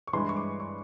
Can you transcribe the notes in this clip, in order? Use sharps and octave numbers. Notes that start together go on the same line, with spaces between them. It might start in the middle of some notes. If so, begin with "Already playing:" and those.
C#6
G2 E3 G#3 C6
C#6
D6
C#6